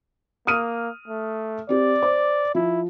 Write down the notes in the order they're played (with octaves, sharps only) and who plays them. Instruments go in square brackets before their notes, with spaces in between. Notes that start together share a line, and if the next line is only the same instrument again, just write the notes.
[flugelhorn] A#3 [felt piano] D#6 F6 D#7
[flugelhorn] A3
[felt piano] C4 G4 [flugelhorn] D5
[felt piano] C5 D6
[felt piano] F3 [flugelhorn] E4